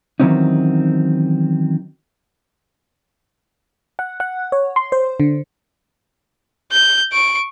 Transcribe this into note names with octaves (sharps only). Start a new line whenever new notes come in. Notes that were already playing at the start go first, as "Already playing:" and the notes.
D#3 E3 F#3 C4 C#4 D#4
F#5
F#5
C#5
C6
C5
D3
G6
C#6 D7